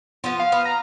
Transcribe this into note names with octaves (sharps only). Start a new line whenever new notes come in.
F3 B3 F4
F5
B3
A#5